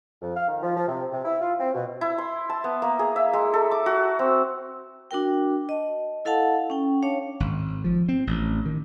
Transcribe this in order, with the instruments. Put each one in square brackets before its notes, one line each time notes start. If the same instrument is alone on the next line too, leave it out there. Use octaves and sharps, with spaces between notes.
[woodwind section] F2
F5
D#3
F3
F3
C3
C3
E4
F4
C4
B2
[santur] E4
C6
A5
B3
A#3
G#4
E5
G#3
A4
D6
F#4
C4
[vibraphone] D4 F#4 A#4 G5
D#5 A5
E4 A4 F5 F#5 A5
C#4 G5
D4 C#5 F5 A5
[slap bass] G#1
F3
C4
A1
D#3